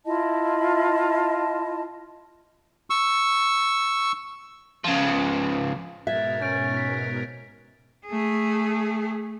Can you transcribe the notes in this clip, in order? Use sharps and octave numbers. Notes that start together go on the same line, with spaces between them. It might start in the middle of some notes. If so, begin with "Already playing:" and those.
E4 F4 D#5 A5
C#6 E6
C#3 F3
G#2 B2 A#4 E5 F#6 G#6 A6
C#4 G6 A6 D7
B6
A3 G#4